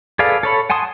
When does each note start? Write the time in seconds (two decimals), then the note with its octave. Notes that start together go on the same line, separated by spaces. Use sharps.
0.19 G#4 A4 B4 D5 F5
0.43 A4 C#5 B5
0.70 F#5 G#5 A5 C6 D#6